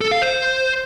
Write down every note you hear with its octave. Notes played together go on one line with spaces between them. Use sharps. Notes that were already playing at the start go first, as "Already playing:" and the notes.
A4
F5
C5